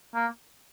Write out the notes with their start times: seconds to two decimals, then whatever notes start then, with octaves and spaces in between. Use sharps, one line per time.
0.14 A#3